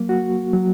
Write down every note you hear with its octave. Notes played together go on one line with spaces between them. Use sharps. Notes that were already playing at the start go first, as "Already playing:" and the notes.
Already playing: F#3 A#3
F#4
F#3